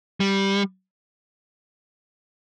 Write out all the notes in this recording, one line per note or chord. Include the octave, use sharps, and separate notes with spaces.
G3